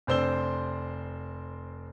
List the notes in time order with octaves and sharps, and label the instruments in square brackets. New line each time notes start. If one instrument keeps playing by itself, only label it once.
[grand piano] F1 C4 D4 C5 E6 G7